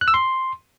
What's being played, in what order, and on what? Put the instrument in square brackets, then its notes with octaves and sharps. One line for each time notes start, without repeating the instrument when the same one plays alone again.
[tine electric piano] F#6
E6
C6